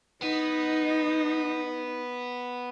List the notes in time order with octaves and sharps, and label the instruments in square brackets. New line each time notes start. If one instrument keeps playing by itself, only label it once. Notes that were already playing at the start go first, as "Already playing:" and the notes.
[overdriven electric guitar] B3 [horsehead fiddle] D#4